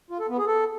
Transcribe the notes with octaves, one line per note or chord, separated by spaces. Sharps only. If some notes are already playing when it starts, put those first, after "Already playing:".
F4
A4
B3
G#4
A4